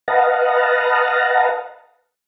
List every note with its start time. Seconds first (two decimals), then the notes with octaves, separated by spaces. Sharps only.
0.08 B4 D#5 F5 F#5 A5 A#5